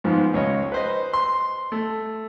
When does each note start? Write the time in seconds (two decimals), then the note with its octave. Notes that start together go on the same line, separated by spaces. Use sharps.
0.04 G#2 D#3 F3 B3
0.34 C#2 C#5 D#5
0.72 B4 C5 D#5
1.13 C6
1.72 A3